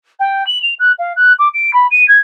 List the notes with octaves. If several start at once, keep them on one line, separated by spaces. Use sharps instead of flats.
G5
F#7
F7
F#6
F5
F#6
D6
D7
B5
D#7
G#6